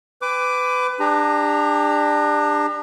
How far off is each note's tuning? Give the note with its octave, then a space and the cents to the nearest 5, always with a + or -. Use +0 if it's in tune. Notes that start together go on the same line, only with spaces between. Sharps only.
B4 +25 G5 +40 D6 +0
D4 +15 G4 +45 A#5 +0